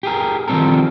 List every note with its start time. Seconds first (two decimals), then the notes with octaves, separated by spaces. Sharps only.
0.03 G4 G#4 A#4
0.48 D#3 F3 G3 C4 A4 A#4